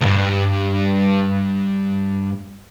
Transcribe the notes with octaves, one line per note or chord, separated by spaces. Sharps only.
C#2 G2